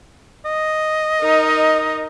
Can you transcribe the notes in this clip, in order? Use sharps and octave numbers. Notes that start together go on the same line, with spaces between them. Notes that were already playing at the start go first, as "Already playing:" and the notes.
D#5
D#4 A#4